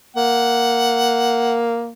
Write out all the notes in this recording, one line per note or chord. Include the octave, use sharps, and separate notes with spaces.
A#3 F#5